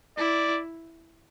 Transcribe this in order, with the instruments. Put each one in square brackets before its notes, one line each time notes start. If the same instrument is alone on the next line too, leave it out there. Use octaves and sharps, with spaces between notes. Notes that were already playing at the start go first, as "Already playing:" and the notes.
[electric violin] E4 [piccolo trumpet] D5